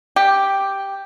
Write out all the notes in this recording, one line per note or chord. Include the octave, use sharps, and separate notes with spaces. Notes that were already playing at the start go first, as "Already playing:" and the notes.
G4